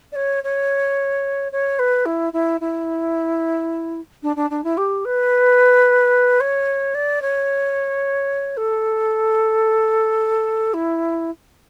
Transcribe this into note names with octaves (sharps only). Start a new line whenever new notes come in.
D5
C#5
C#5
C#5
B4
E4
E4
E4
D4
D4
D4
E4
G4
B4
C#5
D5
C#5
A4
E4